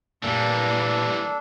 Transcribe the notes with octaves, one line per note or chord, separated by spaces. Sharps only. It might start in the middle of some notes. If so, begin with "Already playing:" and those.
A#2 E3 G3 A#3 D4 A4